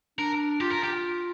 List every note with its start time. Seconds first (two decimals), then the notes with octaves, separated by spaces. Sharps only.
0.19 D4 A#4
0.61 F4 G4
0.72 A#4
0.84 G4